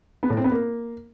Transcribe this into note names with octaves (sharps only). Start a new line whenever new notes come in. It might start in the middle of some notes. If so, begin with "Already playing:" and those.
B3
A2
C4
B3
A#3